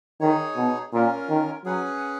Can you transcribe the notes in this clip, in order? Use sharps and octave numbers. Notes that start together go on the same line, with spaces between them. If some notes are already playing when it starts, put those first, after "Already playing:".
D#3 D#4 G#4 C#5
B2
A#2 C#4 F4 A#4
D#3
F#3 C#4 G#4 B4 F#5